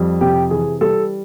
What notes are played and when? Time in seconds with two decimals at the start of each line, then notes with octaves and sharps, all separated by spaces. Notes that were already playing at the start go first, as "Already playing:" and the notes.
Already playing: F2 G3
0.21 C3 G4
0.50 E3 G#4
0.81 G3 A4